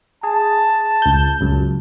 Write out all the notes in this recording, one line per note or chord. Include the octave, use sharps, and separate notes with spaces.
G#4 A5
C#2 G6
C#2 F#2